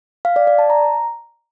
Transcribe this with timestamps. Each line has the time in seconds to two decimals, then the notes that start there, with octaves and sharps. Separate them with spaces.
0.25 F5
0.36 D5
0.47 D5
0.59 A5
0.70 A#5